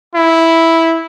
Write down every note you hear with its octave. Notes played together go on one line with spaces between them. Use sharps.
E4